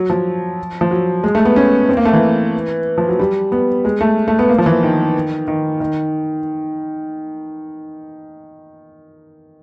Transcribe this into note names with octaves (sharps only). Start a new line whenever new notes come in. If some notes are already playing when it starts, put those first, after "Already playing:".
Already playing: F#3
F3
F3
F#3
G#3
A3
B3
C#4
C4
A#3
A3
E3
F3
F#3
G3
B3
G#3
A3
A3
B3
A#3
F3
E3
D#3
D#3
D#3